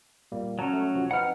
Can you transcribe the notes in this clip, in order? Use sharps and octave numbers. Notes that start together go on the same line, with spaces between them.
A#2 G3 A#3
F#3 C#4 A5 A#5
A3
C3 F3 F#4
C4 D#4 B4 F#5 F6